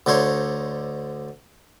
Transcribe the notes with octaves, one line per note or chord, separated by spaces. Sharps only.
D2 D3 D#4 C5 C#5